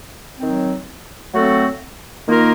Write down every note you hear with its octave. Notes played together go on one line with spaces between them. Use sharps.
D#3 F#3 C4
F#3 A3 C4 F#4 A4
D#3 A#3 F4 A#4